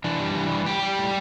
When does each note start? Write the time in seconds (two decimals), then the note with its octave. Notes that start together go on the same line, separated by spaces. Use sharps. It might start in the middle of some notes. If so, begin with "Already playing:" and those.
0.04 E3 D4
0.20 G3
0.35 E3
0.50 G3
0.66 G3 G4
0.83 G3
0.98 A2